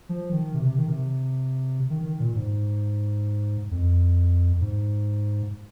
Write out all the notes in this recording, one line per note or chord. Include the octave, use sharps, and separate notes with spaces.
F3
D#3
C3
C3
D#3
C3
D#3
D#3
A#2
G#2
F2
G#2